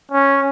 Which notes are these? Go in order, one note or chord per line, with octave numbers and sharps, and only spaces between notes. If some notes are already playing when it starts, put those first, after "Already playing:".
C#4